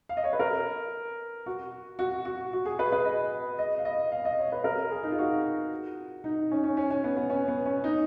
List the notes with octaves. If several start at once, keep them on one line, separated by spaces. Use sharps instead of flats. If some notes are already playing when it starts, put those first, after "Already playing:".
F5
D#5
C#5
B4
A#4
F#4
F#4
F#4
F#4
G#4
B4
B4
D#5
D#5
F5
D#5
F5
D#5
C#5
B4
A#4
G#4
D#4
F4
F#4
D#4
C#4
C#4
C#4
C#4
B3
B3
C#4
B3
C#4
D#4